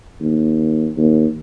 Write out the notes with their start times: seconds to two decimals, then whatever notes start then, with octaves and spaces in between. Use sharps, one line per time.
0.20 D#2
0.97 D#2